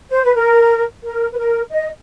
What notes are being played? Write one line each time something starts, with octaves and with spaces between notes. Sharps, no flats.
C5
B4
A#4
A#4
B4
A#4
D#5